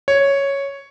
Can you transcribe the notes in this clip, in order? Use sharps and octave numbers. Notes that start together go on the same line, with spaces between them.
C#5